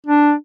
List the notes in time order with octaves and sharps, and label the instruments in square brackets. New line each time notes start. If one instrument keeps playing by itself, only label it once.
[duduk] D4